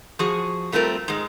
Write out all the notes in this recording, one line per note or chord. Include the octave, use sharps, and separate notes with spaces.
F3 F#4 G#4
G3 A3 C4 F4 A#4
G#2 G#3